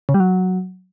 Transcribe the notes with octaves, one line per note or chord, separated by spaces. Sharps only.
C#3
G3
F#3